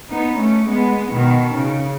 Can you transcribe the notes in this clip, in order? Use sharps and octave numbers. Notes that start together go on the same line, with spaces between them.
B3 D#4
A3 C#4
G#3 B3
B2 D#3
C#3